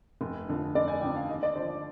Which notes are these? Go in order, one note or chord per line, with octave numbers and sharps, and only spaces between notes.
F1
F2 D3 F3
F1 D5
G#5
F2 D3 F3 G5
F5
D#2 D#5
D5
D3 F3 C5